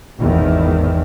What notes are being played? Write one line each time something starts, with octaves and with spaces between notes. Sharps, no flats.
G#1 E2 D#3